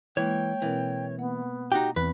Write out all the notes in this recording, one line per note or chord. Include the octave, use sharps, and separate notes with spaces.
E3 G#3 A#3 C#5 G5
B2 E3 C4 A#4
A#3 B3 F#5
D#4 F#4 G4 G5
E2 C4 B4